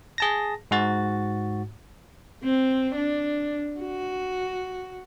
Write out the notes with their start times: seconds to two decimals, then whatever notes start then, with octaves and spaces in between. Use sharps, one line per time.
0.18 G#4 A5 A#6
0.71 G#2 F#4 A6
2.44 C4
2.96 D4
3.80 F#4